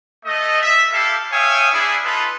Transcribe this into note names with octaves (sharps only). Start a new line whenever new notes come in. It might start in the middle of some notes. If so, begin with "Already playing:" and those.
A3 D#5
E5
E4 G4 A4 F5
C#5 E5 F5 G5 G#5 D#6
D4 E4 G#4
D#4 F4 A4 B4